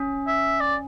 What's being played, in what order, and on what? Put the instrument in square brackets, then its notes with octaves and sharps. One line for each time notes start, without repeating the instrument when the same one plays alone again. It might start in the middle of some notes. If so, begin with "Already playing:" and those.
Already playing: [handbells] C#4
[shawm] E5
D5